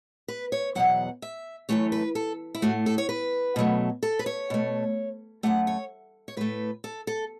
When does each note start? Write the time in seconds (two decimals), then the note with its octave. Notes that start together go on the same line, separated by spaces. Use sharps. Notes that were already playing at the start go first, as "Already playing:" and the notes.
0.28 B4
0.52 C#5
0.75 E2 B2 F#3 F#5
1.22 E5
1.69 F#2 E3 A3 C#5
1.92 B4
2.15 A4
2.55 E4
2.62 A2 A3 F#4
2.86 A4
2.98 C#5
3.09 B4
3.56 B2 F#3 A3
4.03 A4
4.19 B4
4.26 C#5
4.50 B2 A3
5.43 F#2 F#3 A3 F#5
5.67 C#5
6.28 C#5
6.37 A2 A3 B4
6.84 A4
7.07 A4